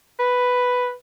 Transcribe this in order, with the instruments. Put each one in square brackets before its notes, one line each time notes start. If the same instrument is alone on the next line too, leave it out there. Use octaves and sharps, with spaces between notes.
[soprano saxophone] B4